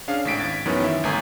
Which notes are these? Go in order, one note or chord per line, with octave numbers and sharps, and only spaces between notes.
C#4 D4 G#4 F5
G#1 A2 B6 D7
G#6 A6
F#2 D#3 E3 B3 C#4
E5
G1 A3 G#5 A#5 D#6